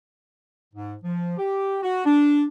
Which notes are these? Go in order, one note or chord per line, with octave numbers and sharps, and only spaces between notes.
G#2
F3
G4
F#4
D4